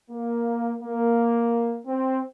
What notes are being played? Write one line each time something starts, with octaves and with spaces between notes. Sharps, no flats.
A#3
A#3
C4